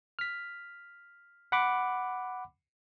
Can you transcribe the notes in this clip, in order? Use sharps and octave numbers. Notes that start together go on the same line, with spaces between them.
F6 B6
F#5 B5 D6